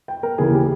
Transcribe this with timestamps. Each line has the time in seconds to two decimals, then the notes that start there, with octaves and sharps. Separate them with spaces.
0.08 G5
0.23 A#4
0.38 D#2 C#3 E3 G#4
0.54 G4